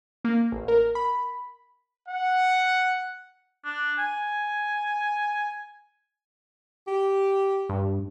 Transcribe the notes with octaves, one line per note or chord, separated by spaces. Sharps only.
A#3
A1
A#4
B5
F#5
D4
G#5
G4
G2